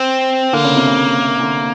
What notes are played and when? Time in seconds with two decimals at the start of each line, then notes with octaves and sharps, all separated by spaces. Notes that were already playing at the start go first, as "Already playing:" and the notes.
Already playing: C4
0.53 D3 A#3
0.64 C#3
0.76 C3
0.87 C#3
1.40 D3